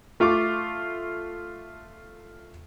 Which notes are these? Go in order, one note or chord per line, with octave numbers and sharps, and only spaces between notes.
A3 F4 C#6 D6